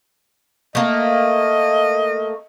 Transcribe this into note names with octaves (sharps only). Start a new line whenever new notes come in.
A3 A#3 D#5